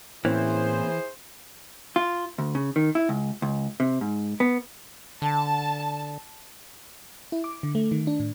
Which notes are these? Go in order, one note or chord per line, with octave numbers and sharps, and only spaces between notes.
A2 E3 A#3 C4 C#4 E4 G#4 C5
F4
D2
C#3
D#3
E4
C#2
C#2
C3
G#2
B3
D3 A5
E4
D6
D3
A3
D#3
D4
A2